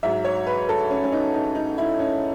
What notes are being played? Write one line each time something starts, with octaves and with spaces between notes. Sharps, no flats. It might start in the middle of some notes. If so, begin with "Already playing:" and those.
G#2 F#3 E5
C#5
B4
A4
C#4
C#4
D#4
D#4
D#4
E4
C#4